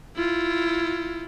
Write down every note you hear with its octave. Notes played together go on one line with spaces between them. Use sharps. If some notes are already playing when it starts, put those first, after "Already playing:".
E4 F4